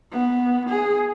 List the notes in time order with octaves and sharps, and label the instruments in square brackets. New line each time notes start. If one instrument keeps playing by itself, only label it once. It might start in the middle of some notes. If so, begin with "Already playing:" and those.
[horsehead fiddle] B3
G#4